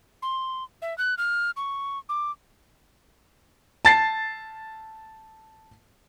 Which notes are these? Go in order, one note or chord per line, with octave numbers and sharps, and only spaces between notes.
C6
E5
F#6
F6
C#6
D6
A5 A6 C7